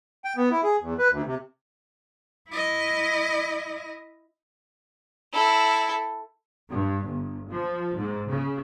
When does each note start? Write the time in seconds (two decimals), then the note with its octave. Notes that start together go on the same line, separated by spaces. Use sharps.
0.25 G5
0.37 B3
0.51 E4
0.63 G#4
0.80 E2
0.98 B4
1.10 D2
1.26 C3
2.50 E4 D#5
5.33 E4 A4
6.69 G2
7.06 G1
7.48 F3
7.94 G#2
8.28 C#3